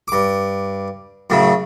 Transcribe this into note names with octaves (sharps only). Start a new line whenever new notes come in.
G2 D6
F#2 A2 C#3